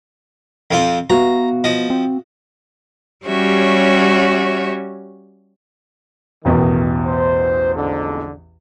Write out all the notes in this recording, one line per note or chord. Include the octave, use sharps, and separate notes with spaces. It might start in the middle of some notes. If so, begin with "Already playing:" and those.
F2 C4 F4
B3 F#4 E5 F5 A#5
F3 D#5
C4
G3 C#4 F#4 G4 C#5 E5
A1 E2 B2 D#3
C5
F2 G#2 D3